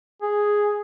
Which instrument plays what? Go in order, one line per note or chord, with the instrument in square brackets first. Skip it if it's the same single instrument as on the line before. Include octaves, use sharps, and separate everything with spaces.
[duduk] G#4